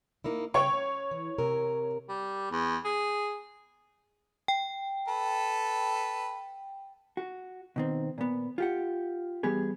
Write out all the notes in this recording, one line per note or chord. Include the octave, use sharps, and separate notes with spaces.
A#3 D#4 E4
C#3 C#5 G5 C#6
C#4
E3
C3 A#4
G3
E2
G#4
G5
A4 B4
F#4
B2 D#3 C4
A#2 B3
F4 G4 F#5
E3 G3 B3 G4 G#4